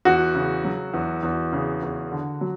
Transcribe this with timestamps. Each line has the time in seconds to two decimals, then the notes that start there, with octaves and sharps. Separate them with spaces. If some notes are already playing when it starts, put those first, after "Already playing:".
0.05 E2 F#4
0.35 C#3
0.65 F#3
0.94 E2
1.23 E2
1.53 C#3
1.83 E2
2.12 D3
2.41 F#3